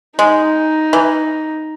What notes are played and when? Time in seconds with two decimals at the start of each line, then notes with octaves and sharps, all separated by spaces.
0.18 G#3 D#4
0.93 E3